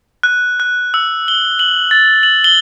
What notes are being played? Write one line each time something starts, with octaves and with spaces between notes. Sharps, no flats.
F#6
F#6
E6
G7
F#7
A6
F#7
G7